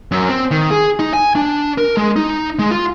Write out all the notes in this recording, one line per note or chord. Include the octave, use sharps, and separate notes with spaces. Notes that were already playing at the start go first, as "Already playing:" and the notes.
F#2
C4
D#3
G#4
D#4
G#5
D4
A#4
G#3
D#4
G#3
F4